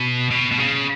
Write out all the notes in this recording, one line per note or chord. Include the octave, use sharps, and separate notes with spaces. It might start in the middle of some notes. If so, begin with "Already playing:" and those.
Already playing: B2
B2
B2
C#3